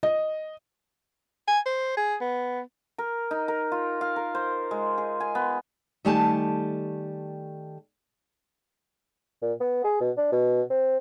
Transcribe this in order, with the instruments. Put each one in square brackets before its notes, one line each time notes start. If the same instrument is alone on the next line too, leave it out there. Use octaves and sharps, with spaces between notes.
[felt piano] D#5
[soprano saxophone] G#5
C5
G#4
B3
[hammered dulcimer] A#4
D#4
A#4
F4
F5
A#4
C5
G#3
G#4
G#5
B3
[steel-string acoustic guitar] D#3 G3 A3 G4 G#5 A5
[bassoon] A#2
B3
G#4
B2
D4
B2
C4